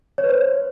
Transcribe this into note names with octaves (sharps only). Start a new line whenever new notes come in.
C#5
B4
C5